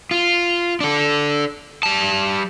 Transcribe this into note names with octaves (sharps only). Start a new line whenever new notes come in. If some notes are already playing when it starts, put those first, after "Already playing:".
F4
D4 A4
G3 A5